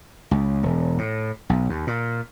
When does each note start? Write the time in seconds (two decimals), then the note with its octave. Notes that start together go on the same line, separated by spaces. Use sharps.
0.31 C#2
0.63 E1
0.98 A2
1.49 B1
1.69 D#2
1.87 A#2